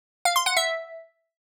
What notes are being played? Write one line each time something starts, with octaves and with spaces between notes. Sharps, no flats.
F5
C6
F#5
E5